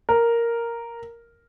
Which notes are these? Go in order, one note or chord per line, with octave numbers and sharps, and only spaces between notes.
A#4